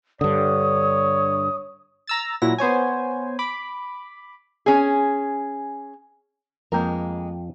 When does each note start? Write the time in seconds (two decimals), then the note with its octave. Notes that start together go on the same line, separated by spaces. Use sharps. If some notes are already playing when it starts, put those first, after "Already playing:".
0.21 G2 D3 C#5 D#6
2.07 A#5 E6 A6
2.42 A#2 F#3 E4 A#6
2.58 B3 C5 C#5 G#5
3.39 B5 D6
4.66 C#4 G#4
6.72 F2 G#3 A#3 A#4 G5